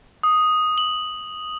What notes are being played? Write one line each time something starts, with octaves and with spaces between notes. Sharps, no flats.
D#6
F#7